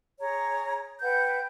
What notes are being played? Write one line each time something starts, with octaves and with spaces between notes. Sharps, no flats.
G#4 C#5 A#5
B4 F#5 G5 G6